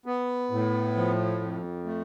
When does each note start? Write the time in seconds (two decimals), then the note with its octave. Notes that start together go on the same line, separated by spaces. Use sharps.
0.06 B3
0.51 A2
0.96 F3
1.41 F2
1.85 A3